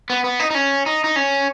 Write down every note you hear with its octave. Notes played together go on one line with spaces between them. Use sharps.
B3
B3
D#4
D#4
C#4
D#4
D#4
C#4